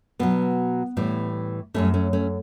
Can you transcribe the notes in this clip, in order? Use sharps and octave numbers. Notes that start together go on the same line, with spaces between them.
B2 F#3 B3
A2 E3 G3
F#2 E3 G3 A3 C#4
A3 C#4
A3 C#4